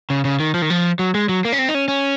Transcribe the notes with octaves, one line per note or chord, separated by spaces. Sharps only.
C#3
C#3
D#3
F3
D#3
F3
F#3
G#3
F#3
A#3
C#4
C4
D#4
C#4
C#4